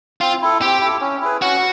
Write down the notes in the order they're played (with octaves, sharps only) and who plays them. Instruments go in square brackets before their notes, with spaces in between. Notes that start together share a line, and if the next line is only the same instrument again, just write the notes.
[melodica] C4 [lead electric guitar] F4
[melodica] E4 A4
[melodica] C4 [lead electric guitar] G4
[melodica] E4 A4
C#4
E4 G#4 B4
[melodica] C#4 [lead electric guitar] F#4